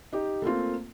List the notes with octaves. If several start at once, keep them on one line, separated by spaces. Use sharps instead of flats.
D#4 G4
A3 A#3 C4 F4